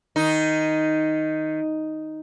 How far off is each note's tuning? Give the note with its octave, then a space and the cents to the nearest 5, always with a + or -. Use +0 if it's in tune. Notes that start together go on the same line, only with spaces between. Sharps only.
D#3 +0 D#4 +0